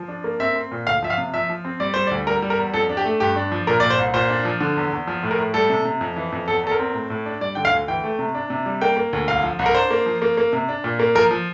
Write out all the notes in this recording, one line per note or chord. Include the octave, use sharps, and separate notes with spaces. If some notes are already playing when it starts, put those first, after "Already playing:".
Already playing: F3
D4
A#3
C4 E5
C4
A#2
D2 F5
F3 E5
F5
C3
F3 E5
F3
C4
G3 D5
G3 C5
D5
D2
G3 A#4
G3
A#4
E2
F2 A4
D4
G4
A3
G2 G4
D4
F3
A#2 A#4
A#2 D5
C5
C2
A#2 C5
D4
F3
D3
E2
E2
F3
A2
A#4
A2
G3 A4
C3
C3
F2
E3
F2
E2 A4
E2 A4
A#4
C4
A2
A2
D4
G3 D5
D3 G5
F5
D2
E3 G5
A3
C3
D4
C3
G3
A#3 G5
A#3
D2
C2 F5
F3
C2
A#4
D4 C5
A#3
F3
A#3
A#3
C3
D4
A#2
A#3
F3 A#4
F3